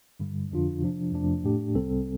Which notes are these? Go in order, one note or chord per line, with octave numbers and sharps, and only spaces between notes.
G2 D3 G3
F2 D3 F3 D4 F4
C3 F3 D4
F2 C3 F3 A3 D4
A2 A3 D4 G4
C2 C3 G3 C4 A4